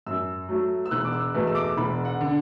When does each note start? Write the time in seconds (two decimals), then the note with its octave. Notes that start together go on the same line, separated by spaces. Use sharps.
0.06 F#2 E6
0.49 F#3 A3
0.86 E6
0.91 E1 F#6
1.05 D6
1.12 E6
1.34 E2 B2 A3
1.47 E6
1.55 D6
1.77 E1 B5
2.05 F#5
2.21 D3